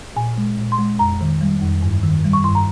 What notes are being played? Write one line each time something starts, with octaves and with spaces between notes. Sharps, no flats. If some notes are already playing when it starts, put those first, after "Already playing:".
A#2 G#5
G#3
A#2
C6
G#3
F2 A#5
D#3
G3
F2
G2
D#3
G3
C#6
G2 C6
A#5